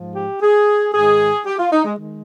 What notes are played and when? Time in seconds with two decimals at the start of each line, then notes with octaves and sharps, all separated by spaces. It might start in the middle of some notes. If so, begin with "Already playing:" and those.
Already playing: G#2 F3
0.16 G4
0.42 G#4
0.94 G#2 D#3 G#4
1.46 G4
1.59 F4
1.72 D#4
1.85 G#3
1.98 D#3 G#3